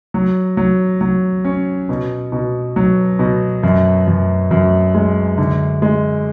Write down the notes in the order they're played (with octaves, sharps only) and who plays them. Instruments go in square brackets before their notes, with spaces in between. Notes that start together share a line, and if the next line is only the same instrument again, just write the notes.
[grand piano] F#3
F#3
F#3
C#4
B2
B2
F#3
B2
F#2
F#2
F#2
G#3
D3
G#3